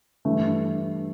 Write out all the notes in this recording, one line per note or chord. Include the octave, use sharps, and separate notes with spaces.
G2 E3 A3